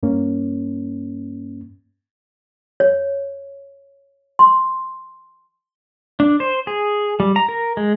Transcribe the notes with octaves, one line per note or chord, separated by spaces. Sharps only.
G2 A#3 C#4
C#5
C6
D4
C5
G#4
G3
A#5
A#4
G#3